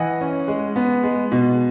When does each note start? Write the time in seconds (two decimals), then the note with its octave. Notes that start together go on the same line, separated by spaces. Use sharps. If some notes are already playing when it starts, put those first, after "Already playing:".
Already playing: E3 D#5 F#5
0.21 C#4
0.48 G#3
0.76 B3
1.04 G#3
1.32 B2